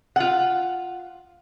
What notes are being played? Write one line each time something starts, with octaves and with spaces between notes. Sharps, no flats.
F4 F#5